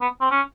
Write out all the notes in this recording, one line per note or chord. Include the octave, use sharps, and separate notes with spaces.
B3
C4
C#4